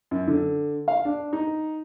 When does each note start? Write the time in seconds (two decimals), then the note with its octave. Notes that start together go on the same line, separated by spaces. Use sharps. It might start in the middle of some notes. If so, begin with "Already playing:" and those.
0.11 F#2
0.28 D3
0.88 F5
1.05 D4
1.33 D#4